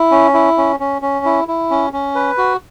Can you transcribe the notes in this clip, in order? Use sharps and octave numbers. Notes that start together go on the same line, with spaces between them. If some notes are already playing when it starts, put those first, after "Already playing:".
Already playing: E4
C#4
E4
C#4
C#4
C#4
E4
E4
C#4
C#4
B4
F#4